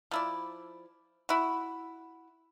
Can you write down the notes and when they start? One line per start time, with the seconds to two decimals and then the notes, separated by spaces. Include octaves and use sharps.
0.11 F3 E4 D5
1.29 E4 F#4